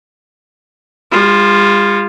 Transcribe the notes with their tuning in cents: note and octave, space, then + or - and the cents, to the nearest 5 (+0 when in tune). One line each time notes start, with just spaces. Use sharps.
G#3 -45 F4 +0